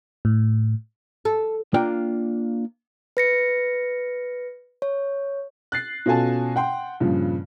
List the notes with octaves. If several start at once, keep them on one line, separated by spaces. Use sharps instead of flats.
A2
A4
A#3 D4 F4 G5
B4 A#6 C#7
C#5
F#6 A6 C7
B2 C#4 F4 A4 G#5 A5
F#5 G5 C6
G2 A#2 C#3 F3